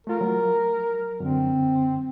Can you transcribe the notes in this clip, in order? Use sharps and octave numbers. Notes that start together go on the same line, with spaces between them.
A3 F4 A#4
F#3
F#2 D3 C4